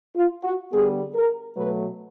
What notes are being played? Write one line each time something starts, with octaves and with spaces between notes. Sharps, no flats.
F4
F#4
D3 G3 B3 G#4
A#4
B2 F#3 A3 B4